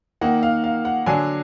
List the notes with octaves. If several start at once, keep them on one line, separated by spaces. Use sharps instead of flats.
D#3 A#3 D#4 F#5
F5
F5
F#5
D3 F#3 D4 G#5